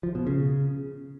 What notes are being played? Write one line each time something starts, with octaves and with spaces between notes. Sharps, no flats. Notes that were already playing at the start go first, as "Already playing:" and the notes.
F3
B2
C#3